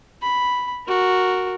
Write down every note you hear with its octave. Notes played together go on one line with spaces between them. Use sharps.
B5
F#4 A#4